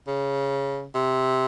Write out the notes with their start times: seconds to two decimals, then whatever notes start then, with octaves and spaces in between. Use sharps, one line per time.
0.07 C#3
0.95 C3